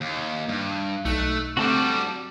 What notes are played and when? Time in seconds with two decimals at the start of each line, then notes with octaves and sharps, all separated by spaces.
0.01 D#2
0.49 G2
1.05 B1 A3 D#4 F#6
1.57 D3 G3 A3 C4 F#4 A5 D6